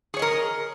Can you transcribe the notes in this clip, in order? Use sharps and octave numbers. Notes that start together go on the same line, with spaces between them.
G#4 A#4 C#5 D#5